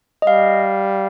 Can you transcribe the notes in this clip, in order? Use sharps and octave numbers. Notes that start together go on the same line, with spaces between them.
D#5
G3 F5